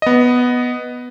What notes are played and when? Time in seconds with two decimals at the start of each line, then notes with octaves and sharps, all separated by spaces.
0.02 B3 D#5